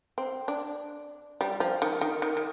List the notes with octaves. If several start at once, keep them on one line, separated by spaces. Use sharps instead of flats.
C4
D4
G3
F3
D#3
D#3
D#3
D#3